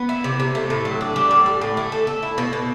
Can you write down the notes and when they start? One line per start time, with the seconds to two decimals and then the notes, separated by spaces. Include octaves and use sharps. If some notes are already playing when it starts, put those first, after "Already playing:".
Already playing: B3
0.09 E4
0.24 C3
0.40 C3
0.55 A3
0.70 A2
0.85 F#3
1.01 D4
1.16 G3
1.31 A2
1.46 G3
1.61 A2
1.77 A3
1.92 A4
2.07 A4
2.22 E4
2.38 B2
2.53 B2